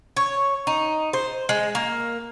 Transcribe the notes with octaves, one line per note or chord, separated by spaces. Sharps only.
C#5
D#4
C5
G#3
A#3